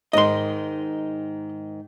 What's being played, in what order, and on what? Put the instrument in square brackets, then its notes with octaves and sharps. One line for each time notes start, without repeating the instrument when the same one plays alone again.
[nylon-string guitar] G#2 D#3 [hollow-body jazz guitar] D#5 C6